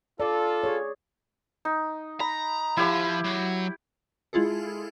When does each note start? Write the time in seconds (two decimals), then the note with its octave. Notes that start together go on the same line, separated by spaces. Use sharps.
0.20 F4 A4 D5
0.64 G#4 C#5
1.65 D#4
2.20 A#5 B5
2.77 F3 E4 F4 G4 F#5
3.25 F#3
4.33 G#3 E4 F4 G#4 A4